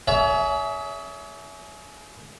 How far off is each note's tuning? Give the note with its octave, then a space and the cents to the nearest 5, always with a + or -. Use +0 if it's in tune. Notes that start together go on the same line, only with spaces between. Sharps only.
G#4 +30 C#5 +40 E5 +0